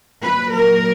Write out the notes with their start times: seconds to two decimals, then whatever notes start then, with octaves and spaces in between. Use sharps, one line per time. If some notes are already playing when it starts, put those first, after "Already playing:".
0.23 A#2 F#3 B4
0.54 A#4